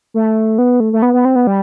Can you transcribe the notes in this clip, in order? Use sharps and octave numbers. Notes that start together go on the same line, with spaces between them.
A3
B3
A3
A3
B3
B3
C4
B3
G3